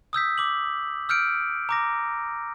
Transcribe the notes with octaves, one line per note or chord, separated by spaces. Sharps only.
D#6 E6 G6 B6
D6 F#7
E6 F6 G6 C#7 D7
A#5 D6 A#6